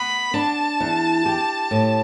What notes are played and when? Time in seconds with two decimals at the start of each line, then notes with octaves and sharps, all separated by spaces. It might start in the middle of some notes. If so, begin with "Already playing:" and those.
Already playing: B3 B5
0.34 D4 A5
0.80 E2
1.26 G4
1.71 A2